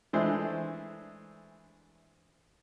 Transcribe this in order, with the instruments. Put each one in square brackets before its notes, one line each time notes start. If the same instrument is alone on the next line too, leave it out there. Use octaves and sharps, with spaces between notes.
[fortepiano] E3 G#3 A3 D4 C5